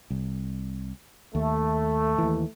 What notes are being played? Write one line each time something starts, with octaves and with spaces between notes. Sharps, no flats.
C2
D#2 A3
D#2 E3